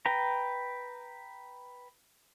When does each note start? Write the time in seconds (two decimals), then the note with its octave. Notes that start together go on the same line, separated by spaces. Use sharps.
0.06 B4 G5 A#5